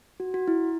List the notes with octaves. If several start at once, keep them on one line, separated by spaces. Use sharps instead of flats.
F#4
F#4
E4